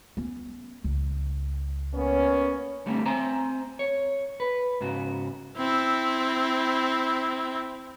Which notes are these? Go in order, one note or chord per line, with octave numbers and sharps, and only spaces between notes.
B3 C#4
C#2
A#3 B3 C#4
D3 G3 A3 A#3 C4 D4
C4 C5 G#5 A#5
C#5
B4
G#2 C#3 F#4
C4 E4